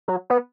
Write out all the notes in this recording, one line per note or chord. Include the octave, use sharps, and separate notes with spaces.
F#3
B3